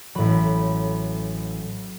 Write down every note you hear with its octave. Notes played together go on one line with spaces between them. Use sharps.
A1 A2 F#3 B5